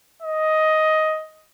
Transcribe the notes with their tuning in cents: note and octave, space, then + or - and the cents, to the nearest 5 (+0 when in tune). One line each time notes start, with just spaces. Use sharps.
D#5 +10